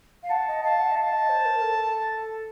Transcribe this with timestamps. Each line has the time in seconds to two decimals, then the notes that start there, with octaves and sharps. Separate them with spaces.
0.23 F5
0.30 F#5 A5
0.48 D#5
0.63 F5 A5
0.80 F#5
0.91 D#5
0.97 F5 A5
1.13 D#5
1.29 C5
1.45 A#4
1.62 A4